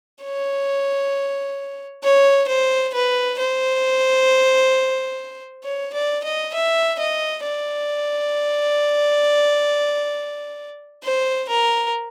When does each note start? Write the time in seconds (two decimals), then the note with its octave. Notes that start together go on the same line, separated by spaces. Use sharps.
0.23 C#5
2.04 C#5
2.48 C5
2.94 B4
3.39 C5
5.64 C#5
5.94 D5
6.24 D#5
6.54 E5
6.99 D#5
7.44 D5
11.04 C5
11.49 A#4